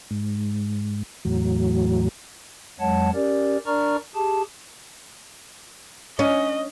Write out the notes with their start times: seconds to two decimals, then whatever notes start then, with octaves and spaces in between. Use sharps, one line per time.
0.11 G#2
1.25 E2 A2 F#3
2.80 F2 F#3 G#3 C#5 F#5 A5
3.14 C#4 G4 A#4 D5
3.66 D4 A#4 D5 A#5 C#6 F6
4.15 G4 G#4 A5
6.19 C#4 D#5